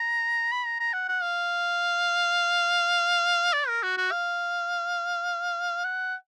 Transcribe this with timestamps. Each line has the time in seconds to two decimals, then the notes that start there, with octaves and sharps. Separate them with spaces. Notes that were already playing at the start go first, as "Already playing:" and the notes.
Already playing: A#5
0.52 B5
0.65 A#5
0.80 A#5
0.93 F#5
1.08 F#5
1.22 F5
3.53 D5
3.68 A#4
3.83 F#4
3.97 F#4
4.12 F5
5.84 F#5